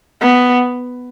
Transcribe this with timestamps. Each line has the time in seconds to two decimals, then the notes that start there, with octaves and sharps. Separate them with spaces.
0.21 B3